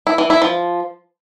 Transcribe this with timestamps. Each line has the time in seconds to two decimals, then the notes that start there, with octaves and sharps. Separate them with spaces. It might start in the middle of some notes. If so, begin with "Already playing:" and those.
0.07 E4
0.18 E3
0.30 E4
0.42 F3